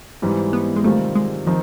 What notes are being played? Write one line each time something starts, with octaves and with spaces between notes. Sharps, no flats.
G#2 E3 G3 C4
B3
G#3
C3 D#3 G3 A3 C4 F4
G#3
D#3 F3 C4 D#4